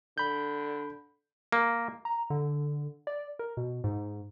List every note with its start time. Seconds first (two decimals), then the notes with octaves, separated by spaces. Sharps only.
0.18 D3 B5 G6
1.52 A#3
2.05 A#5
2.30 D3
3.07 D5
3.39 A#4
3.57 B2
3.84 G#2